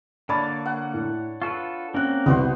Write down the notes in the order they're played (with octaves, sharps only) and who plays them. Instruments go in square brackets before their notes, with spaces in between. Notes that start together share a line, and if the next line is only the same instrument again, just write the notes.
[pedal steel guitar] D3 A#3 [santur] D4 C#5 A5 [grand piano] B5 A6
[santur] F#5
[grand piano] A2
[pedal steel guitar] F4 A4 B4 [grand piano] C#6
[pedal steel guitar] A#3 C4 A#4 [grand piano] C#4 F#6
[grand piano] C2 [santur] B3 F#4 C5